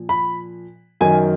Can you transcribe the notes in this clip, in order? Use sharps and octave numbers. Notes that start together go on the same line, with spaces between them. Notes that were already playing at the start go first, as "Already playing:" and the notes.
Already playing: A#2 F3
B5
F#2 D#3 G#5